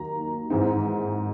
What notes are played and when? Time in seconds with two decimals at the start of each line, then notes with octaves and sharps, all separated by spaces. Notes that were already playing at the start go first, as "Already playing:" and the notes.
Already playing: D#2 D#3 F#3 A#5
0.50 G#2 E3 G#3 C4 D#4